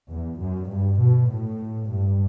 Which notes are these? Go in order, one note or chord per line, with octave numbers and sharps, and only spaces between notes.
E2
F#2
G2
B2
A2
G2